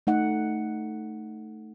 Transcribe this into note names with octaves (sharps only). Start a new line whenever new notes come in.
A3 D#4 F#5